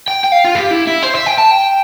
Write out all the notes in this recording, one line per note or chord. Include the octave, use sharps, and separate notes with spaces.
G5
G5
F5
F4
G4
E4
E4
C5
E5
G5
A5
G5